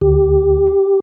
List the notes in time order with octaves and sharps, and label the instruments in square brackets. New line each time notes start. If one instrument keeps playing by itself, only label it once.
[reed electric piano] D2 [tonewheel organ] G4